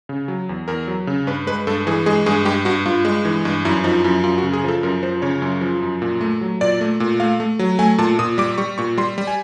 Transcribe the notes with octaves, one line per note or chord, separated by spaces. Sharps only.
C#3
F#3
E2
E2 A#4
F#3
C#3
G2 B4
G#3 B4
G2 A4
E3 G#4
G#3 G#4
G2 G#4
G2 G4
G2 F#4
G2 F4
G#3
E3
G2
F#2 E4
F3 D#4
F#2 E4
F#2 F4
F#4
C#3
G#4
F3 A4
F#2 A#4
F3 C5
C#3 C#5
F#2
F3
F#2
A#2
A3
F#3
A#2 D5
A3
A#2
A3 F5
A3
F#3
A3 G#5
A#2 A5
A#2 D#6
G3 D6
G3 C#6
A#2 C#6
G3 C6
G3
G#5